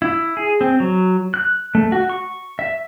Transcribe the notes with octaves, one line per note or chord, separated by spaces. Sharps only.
E4
G#4
C4
F#3
F#6
A3
F#4
C#6
E5